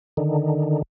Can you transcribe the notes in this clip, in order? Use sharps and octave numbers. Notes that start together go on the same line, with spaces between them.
D3 D#3